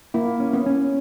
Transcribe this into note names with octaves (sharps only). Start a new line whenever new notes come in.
A#3 E4
C#4
B3
C#4